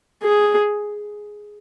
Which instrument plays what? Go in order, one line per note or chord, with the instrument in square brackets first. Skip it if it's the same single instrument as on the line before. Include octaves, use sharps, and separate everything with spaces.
[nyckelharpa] G#4